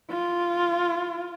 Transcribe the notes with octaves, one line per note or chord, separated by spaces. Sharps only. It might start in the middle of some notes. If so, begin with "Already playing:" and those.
F4